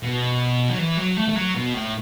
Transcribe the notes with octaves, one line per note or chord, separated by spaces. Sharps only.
B2
F#3
E3
F#3
A3
A3
F#3
B2
A2